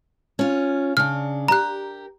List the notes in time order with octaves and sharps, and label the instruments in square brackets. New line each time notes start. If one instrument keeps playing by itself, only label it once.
[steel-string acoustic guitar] C#4 F4
[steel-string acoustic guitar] C#3 D4 [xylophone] F6
[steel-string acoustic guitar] G4 A#4 [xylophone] A#5 F#6